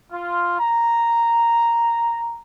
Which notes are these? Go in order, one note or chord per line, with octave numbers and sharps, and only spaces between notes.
F4
A#5